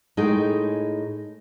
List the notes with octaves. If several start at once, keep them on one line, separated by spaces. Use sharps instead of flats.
A2 G#3 D#4 G#4 A#4 G5